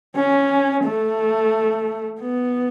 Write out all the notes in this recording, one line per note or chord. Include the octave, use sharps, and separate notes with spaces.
C#4
A3
B3